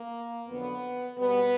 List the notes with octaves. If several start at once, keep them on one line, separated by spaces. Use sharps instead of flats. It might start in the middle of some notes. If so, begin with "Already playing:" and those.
Already playing: A#3
F2 D3 F#3 B3
B2 G3 B3